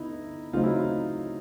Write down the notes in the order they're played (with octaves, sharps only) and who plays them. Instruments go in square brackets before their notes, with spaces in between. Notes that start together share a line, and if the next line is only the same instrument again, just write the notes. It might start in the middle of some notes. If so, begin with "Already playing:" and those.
Already playing: [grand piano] D3 B3 D#4 E4
C#3 F#3 A3 C4 D#4 F4
E4
E4